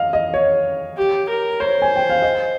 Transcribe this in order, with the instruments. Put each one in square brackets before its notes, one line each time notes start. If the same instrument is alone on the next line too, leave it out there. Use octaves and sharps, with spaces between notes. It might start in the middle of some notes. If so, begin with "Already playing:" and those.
Already playing: [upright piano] D#5 F5
D#5
C#5
[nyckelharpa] G4
A#4
[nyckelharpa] C5 [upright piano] C#5
[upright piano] G#5
G5
F5
D#5